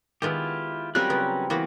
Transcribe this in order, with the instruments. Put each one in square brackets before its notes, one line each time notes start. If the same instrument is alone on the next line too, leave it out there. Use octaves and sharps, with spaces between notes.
[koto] D#3 G#3 B3 [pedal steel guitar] E4 F4 G4
[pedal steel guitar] F#3 C#4 F#6 [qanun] G3 C4 A#4 [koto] F4
[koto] C#3 B3
[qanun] E3 [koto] A#3 B3 F#4